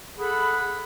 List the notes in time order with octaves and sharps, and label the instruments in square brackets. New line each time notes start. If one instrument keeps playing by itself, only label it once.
[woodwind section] G#4 A4 F#5 B5